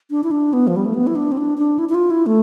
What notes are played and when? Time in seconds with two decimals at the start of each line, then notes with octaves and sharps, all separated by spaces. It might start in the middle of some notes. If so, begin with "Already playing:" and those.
0.11 D4
0.24 E4
0.31 D4
0.53 B3
0.67 F3
0.76 G3
0.86 A3
0.94 B3
1.07 E4
1.16 D4
1.32 C4
1.37 D4
1.58 D4
1.79 E4
1.89 E4
1.94 F4
2.10 E4
2.26 A3